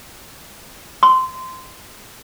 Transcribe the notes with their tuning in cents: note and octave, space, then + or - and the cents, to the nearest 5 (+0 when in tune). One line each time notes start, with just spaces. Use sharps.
C6 -15